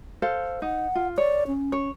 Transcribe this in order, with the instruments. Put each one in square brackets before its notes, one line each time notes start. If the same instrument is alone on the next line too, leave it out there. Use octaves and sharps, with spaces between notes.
[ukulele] A4 C5 F5
[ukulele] D#4 [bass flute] F#5
[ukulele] F4
[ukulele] C#5 [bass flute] D5
[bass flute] C#4
[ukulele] C#5